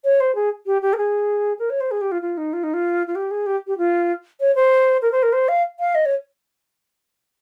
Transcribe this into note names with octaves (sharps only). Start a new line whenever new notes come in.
C#5
C5
G#4
G4
G4
A#4
G#4
A#4
C#5
C5
G#4
G4
F4
F4
D#4
F4
D#4
F4
F4
G4
G#4
G4
G4
F4
C#5
C5
A#4
C5
A#4
C5
F5
F5
D#5
C#5